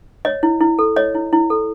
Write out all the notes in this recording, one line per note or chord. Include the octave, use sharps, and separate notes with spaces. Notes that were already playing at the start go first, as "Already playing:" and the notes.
C#5 D#5
E4
E4
A4
C#5 D#5
E4
E4
A4